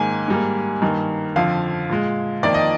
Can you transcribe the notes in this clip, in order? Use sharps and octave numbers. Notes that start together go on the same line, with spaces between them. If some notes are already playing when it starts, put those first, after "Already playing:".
Already playing: G#2 D#3 A#3 G#5
G#2 G3 A#3
G2 D#3 A#3
F2 D3 F3 F5
A#2 G#3
F2 D#3 A#3 D5
D#5